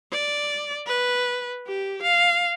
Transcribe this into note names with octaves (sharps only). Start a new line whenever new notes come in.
D5
B4
G4
F5